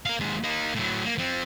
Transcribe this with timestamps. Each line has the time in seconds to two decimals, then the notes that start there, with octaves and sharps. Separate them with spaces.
0.06 A#4 F5
0.20 D#2 G#3
0.44 A#3 D#4
0.75 A2 F#3
1.05 A#3
1.18 F3 C4